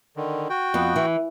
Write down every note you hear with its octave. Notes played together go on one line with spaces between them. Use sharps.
D3 D#3
F#4 G5
F2 B3
E3